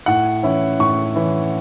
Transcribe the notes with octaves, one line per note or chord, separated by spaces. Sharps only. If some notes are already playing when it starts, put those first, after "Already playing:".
A2 F#5
E3 C#4 E4
A2 C#6
E3 C#4 E4